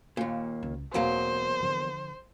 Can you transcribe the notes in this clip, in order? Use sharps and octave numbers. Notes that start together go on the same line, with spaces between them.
D#2 A#2
C#2
E1 E2 F#3 A#3 C4 C5
D3 F3